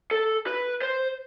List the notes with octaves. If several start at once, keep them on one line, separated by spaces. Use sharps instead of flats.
A4
B4
C5